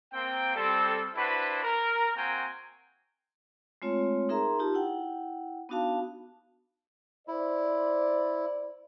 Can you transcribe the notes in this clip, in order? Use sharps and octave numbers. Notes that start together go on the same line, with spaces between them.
A#3 C4 G5
G3 C4 A4
D4 E4 F#4 B4 C5 B5
A#4
A#3 C4 F#4 G5 G#5 A#5
G#3 A3 C4 F4 C#5 C6
D#4 G#4 A#4 E5 A#5 C6
D#4 F4 G4 A5
E4 F#5 G5
B3 D4 D#4 F#4 F5 A5
E4 C5 D5